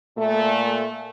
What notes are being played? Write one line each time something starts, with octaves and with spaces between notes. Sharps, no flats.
A#2 A3